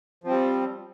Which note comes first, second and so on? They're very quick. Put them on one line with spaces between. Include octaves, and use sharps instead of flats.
F3 C4 G3